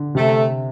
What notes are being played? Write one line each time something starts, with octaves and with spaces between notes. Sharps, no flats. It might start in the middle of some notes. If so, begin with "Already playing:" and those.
Already playing: D3
C3 A3